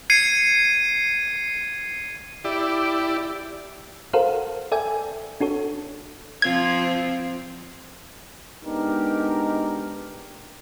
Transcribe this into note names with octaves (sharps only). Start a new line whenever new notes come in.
G#6 C7 C#7 D#7
E4 G4 D5
F#4 A4 A#4 C5 F5 F#5
A4 D5 E5 G5 G#5
D4 F#4 A4 C#5
F3 C4 F4 G#6
G#3 B3 D4 D#4 G4 A#4